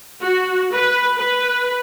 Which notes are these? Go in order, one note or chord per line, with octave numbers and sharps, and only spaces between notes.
F#4
B4
B4